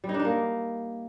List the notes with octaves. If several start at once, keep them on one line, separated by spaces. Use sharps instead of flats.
G3
D#4
D4
D#4
A#3